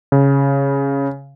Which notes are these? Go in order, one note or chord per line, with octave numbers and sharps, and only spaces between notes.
C#3